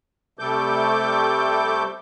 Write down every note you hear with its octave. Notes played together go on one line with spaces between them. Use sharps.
C3 G3 A3 A4 D6 G6